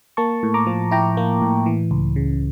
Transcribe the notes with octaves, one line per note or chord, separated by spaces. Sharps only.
A#3 A5 C#6
A2
A#5 D6
F3
E4 G5 A#5
A#3
A2
E3
C#2
C#3